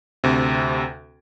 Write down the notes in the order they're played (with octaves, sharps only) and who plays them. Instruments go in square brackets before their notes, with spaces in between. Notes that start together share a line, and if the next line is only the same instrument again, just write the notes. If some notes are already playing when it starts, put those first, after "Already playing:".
[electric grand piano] D2 C3